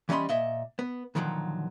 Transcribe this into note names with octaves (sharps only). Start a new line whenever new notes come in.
E3 G3 C#4 D#5 B5 C6
A#2 D#5 E5
B3
A#2 D3 D#3 F3 F#3